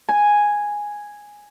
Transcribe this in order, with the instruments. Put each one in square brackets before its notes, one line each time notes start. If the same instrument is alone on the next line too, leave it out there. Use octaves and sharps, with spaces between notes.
[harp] G#5